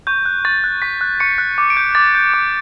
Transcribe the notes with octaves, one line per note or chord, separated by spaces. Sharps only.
C#6 G6
F#6
C#6 A6
F#6
C#6 B6
F#6
C#6 C#7
F#6
D6
D7
G6
D6 A6
G6
D6